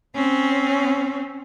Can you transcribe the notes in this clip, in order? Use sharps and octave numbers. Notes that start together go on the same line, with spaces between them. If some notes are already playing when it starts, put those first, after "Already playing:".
C4 C#4